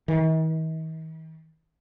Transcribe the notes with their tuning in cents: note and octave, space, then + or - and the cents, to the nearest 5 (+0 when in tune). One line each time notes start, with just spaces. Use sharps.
D#3 +45